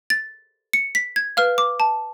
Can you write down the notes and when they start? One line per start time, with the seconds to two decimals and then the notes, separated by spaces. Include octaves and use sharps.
0.10 A6
0.73 C#7
0.95 B6
1.16 G#6
1.37 B4 F5 F6
1.58 D6
1.80 A5